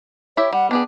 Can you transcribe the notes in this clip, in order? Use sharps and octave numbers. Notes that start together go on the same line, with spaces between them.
E4 G4 C#5 E5
G3 F#5
B3 D4 G4 G#4